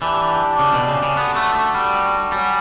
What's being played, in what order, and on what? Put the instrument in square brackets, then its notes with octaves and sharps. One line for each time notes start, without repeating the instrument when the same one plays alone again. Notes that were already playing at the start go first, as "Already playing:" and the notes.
[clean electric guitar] E3 [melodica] D4 G4 D5
[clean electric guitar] C#3
B2
C#3
C#3
[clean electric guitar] B3 [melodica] D4 F#4 A4
[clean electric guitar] A3
A3
G3
[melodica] F#3 C#4 F#4 [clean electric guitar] G3